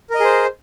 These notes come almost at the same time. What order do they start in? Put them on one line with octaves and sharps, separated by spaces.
A#4 D#5 G#4 C5